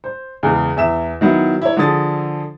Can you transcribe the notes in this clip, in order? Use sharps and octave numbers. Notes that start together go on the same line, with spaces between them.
C5
E2 C#3 G#3
E2 E5 E7
D#3 F#3 B3 E4
E4 C#5
D3 F3 G#4 A4 D#6 A6